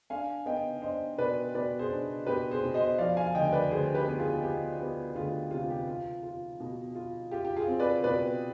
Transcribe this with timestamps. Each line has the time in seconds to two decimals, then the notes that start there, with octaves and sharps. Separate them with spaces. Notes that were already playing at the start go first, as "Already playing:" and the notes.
0.10 D4 F5 G#5
0.46 B3 D#5 G5
0.82 D4 C5 D#5
1.18 B2 B4 D5
1.54 B2 B4 D5
1.79 G#4 C5
1.90 D4
2.26 B2 G4 B4
2.51 G#4 C5
2.63 B2
2.74 C5 D#5
2.98 F3 D5 F5
3.17 F5 G#5
3.35 D2 D#5 G5
3.52 B4 D5
3.71 D2 G#4 C5
3.95 G4 B4
4.07 B3 G4
4.19 F4 G#4
4.43 B3 G4
4.80 B3 G4
5.15 D2 F4 G#4
5.51 C3 F4
5.70 G4
5.88 F4
6.23 F4
6.60 B2
6.95 F4
7.31 F4 G4
7.45 G4
7.56 F4 G#4
7.68 C4
7.80 B4 D5
8.04 B2 B4 D5